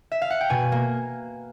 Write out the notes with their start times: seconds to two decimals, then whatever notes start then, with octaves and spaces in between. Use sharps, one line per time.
0.12 E5
0.22 F5
0.30 F#5
0.41 G5
0.50 B2 G#5
0.72 A#3